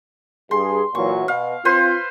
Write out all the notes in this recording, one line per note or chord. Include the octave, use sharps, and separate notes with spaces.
G2 G#4 C6
A#2 E3 F#3 C#6
B2 F5
C4 F4 B4 C5 C6